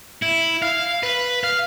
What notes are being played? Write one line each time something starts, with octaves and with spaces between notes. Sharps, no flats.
E4
F5
B4
F5